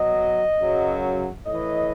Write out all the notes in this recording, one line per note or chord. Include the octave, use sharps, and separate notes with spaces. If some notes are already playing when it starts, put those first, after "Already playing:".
Already playing: B2 F#3 D#5
F#2 C#3 F#3
A2 E3 D#5